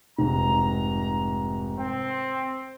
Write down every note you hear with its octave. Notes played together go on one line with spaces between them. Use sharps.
F1 G#2 A#5
C4 G5